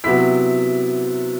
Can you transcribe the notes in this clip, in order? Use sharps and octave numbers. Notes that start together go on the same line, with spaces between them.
C3 F#3 B3 E4 B6